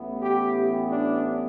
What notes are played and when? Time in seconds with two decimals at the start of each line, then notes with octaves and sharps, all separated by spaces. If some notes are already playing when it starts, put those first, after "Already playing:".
Already playing: A1 A2 E3 B3
0.22 G4
0.92 D4